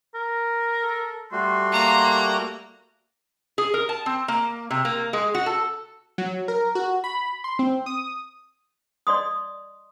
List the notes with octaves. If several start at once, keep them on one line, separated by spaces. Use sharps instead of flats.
A#4
A4
G3 A3 F#4 C6
A#3 A#5
G#4
A#4
A5
C4
A#3
C3
A#3
G#3
F#4
A4
F#3
A#4
F#4
B5
C6
C4
D#6
D5 D#5 C6 D#6